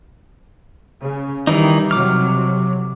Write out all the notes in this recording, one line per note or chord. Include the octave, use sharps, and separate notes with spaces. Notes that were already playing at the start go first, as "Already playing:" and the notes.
C#3
D#3 E3 G3 D#4
F2 C3 F#3 D6 F6